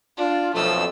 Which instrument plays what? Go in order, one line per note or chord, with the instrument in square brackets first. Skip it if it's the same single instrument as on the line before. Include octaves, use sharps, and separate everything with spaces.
[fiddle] D4 [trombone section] F4
[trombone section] B1 F2 [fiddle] A3 E6